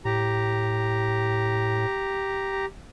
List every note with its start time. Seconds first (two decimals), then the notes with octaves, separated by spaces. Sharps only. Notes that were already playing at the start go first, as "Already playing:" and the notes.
0.05 A2 G4 A#5